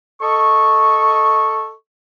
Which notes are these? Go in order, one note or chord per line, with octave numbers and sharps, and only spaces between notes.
A4 D#5 C#6